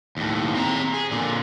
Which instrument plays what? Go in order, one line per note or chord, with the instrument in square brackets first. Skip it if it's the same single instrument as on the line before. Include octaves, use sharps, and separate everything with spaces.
[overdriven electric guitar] D#2 A2
C4 A#5
G#4
A#2 D3